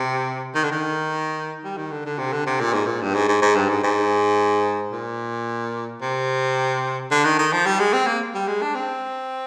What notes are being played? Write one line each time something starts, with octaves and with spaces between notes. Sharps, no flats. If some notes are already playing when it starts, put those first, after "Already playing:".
Already playing: C3
D#3
D3
D#3
G3
D#3
D3
D3
C3
D3
C3
A#2
G#2
A#2
G2
G#2
G#2
G#2
G2
G#2
G#2
A#2
C3
D3
D#3
D#3
F3
G3
G#3
C4
A#3
G3
G#3
D4
C4